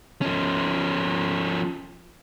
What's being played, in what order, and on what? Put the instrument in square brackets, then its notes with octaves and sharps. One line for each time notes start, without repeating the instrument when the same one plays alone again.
[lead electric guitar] F3 C#4